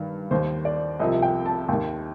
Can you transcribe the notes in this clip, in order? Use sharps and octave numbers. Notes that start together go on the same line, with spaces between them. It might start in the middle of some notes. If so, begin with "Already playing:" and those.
Already playing: G2 D#3
D#2 D#3 C5
D5
C2 C3 F3 D#5
G5
A5
D#2 D#3 G5